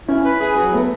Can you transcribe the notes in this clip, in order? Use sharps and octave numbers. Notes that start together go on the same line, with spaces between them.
C#4 E4
B4
G#4
F#3
A3 B3